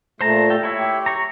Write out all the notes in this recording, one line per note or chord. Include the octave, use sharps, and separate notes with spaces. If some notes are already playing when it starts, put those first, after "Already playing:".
A#2 A3 C5 A5 A#5
G4 A4
E4 C#5 E5
G4
A#5 C#6